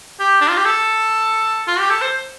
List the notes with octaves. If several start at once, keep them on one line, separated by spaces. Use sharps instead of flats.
G4
D4
F4
G4
A4
F4
G4
A4
C5